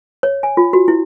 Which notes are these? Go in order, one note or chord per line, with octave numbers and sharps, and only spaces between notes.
C#5
G#5
F4
F#4
E4